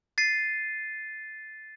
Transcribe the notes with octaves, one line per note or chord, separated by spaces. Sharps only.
A6 C7 D#7